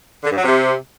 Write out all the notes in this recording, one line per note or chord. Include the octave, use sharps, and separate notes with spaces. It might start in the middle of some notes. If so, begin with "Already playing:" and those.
D3
G2
F#3
C3